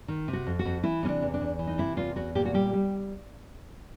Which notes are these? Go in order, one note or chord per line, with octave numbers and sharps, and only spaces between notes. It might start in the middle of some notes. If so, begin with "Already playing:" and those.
D#3
C3
F#4
F2
F#4
F2
E3 E4
C3 C#4
D4
E2
D4
E2
E3
D#4
C3 E4
E2 F4
E2 F#4
A#2 G4
F#4
G3 G4
G3